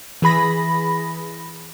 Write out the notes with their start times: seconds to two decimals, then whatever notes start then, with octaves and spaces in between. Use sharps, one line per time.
0.22 E3 G#4 B5 A#6